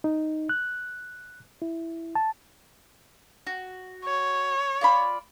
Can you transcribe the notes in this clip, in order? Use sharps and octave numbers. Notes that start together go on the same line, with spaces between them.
D#4
F#6
E4
A5
F#4
C#5
F4 D5 B5